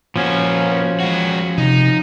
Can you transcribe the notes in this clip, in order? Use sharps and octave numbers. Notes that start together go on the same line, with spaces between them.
A#2 F3 C#4 F#4
G#3 F#4
C3 D#4